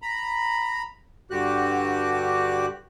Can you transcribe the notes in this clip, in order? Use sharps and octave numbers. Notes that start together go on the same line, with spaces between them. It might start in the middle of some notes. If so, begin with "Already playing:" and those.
A#5 B5
G2 D3 F#4 G4 F#6